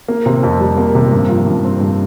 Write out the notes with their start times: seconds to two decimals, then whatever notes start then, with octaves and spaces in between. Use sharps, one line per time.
0.08 A#3
0.26 C3
0.43 F2
0.60 G3
0.78 A#3
0.95 C3
1.12 G2
1.30 F3
1.46 G2
1.64 C4
1.81 G2